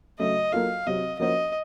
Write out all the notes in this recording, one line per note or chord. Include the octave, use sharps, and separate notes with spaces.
C#3 F#3 A3 D#5
F#3 A#3 F4 A4 F5
C3 F#3 C4 D#5
F3 A#3 C#4 F#4 C5 D#5